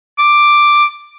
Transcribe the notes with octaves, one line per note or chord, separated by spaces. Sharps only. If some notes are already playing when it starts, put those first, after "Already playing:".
D6